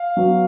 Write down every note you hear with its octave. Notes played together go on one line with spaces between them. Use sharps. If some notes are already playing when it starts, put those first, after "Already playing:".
Already playing: F5
F#3 B3